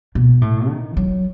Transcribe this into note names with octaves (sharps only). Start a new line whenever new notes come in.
B2
A2
D#3
F#3